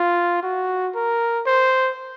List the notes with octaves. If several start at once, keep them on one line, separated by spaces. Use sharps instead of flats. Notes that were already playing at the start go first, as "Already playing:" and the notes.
Already playing: F4
F#4
A#4
C5